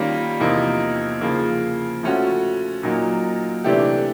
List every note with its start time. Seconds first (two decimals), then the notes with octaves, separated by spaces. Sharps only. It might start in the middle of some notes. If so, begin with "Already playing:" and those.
Already playing: D#3 G3 A#3 C#4 F4
0.40 E2 C3 F3 A#3 D#4
1.21 C#3 F3 A#3
2.03 F3 A3 C#4 F#4
2.83 A#2 F#3 A#3 D#4
3.64 C3 E3 A3 D4 G4